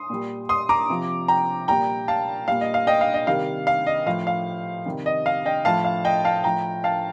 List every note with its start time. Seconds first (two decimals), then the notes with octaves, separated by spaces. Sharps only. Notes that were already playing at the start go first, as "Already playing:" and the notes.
Already playing: C6 D#6
0.10 A#2 G3
0.49 C6 D#6
0.69 A#5 D6
0.90 C3 F3
1.28 G5 A#5
1.68 A#2 G3 G5 A#5
2.08 F5 A5
2.48 A#2 G3 F5
2.61 D#5
2.74 F5
2.87 D#5 G5
3.01 F5
3.14 D#5
3.27 C3 D#3 G3 F5
3.67 F5
3.87 D#5
4.06 A2 F3 F5
4.27 F5
4.86 C3 D#3 G3
5.06 D#5
5.26 F5
5.46 D#5 G5
5.65 A2 F3 F5 A5
5.85 F5
6.05 D#5 G5
6.25 F5 A5
6.44 A2 F3 G5 A#5
6.84 F5 A5